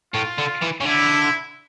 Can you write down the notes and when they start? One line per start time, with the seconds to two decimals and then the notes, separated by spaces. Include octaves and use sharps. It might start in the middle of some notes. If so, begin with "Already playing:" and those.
0.14 A2 F4
0.38 D3
0.62 E3
0.81 C#3
0.85 D3 E4